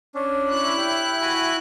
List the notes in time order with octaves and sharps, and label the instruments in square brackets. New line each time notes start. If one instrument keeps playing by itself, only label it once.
[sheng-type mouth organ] C#4 D4
[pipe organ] E4 F#6
[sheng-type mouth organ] G4
F#4 G#5 B5